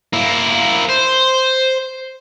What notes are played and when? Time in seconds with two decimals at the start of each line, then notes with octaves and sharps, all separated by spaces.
0.13 A#3 E4
0.90 C5